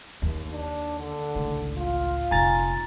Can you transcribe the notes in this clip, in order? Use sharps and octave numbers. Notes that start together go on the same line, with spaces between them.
D#2
D4
D3
G#1 C#2 A2
F4
F1 A#2 G#5 A#5 A6